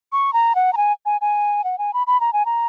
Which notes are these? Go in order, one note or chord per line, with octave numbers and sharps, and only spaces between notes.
C#6
A#5
F#5
A#5
G#5
G#5
G#5
F#5
G#5
B5
B5
A#5
G#5
A#5